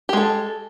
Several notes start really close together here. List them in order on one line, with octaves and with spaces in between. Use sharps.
G4 G#3 A4